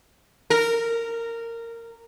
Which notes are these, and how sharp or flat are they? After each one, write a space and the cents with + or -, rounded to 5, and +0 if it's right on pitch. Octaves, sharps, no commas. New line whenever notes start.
A#4 -15